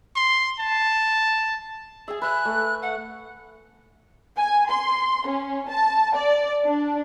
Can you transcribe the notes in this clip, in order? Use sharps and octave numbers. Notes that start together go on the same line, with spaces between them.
C6
A5
G#4 E5 G#5
B4 E5 F#6
A3
F#5
G#5
C6
C#4
A5
D5
D4